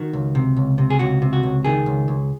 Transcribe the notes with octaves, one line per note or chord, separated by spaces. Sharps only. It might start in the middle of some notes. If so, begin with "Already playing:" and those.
Already playing: D#3 F#4
C#2
C3
C#2
C3
G#4
C#2 F#4
C3
F#4
C#2
D#3 G#4
C#2
C#2